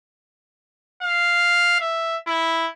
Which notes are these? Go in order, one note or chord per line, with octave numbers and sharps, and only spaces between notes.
F5
E5
E4